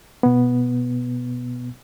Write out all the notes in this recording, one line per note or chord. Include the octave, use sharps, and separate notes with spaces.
B2 B3